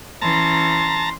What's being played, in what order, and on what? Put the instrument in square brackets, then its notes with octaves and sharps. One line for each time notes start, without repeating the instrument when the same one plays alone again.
[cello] E3 C#4 [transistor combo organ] A5 A#5 [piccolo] C6